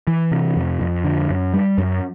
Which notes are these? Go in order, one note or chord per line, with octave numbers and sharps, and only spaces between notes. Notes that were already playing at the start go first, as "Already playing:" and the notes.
E3
C3
F2
F2
D3
F#2
G3
F#2